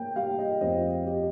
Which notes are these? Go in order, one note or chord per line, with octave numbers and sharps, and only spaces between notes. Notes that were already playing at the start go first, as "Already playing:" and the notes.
Already playing: A#3 G5
G3 F5
D#5
F2 D#5
G4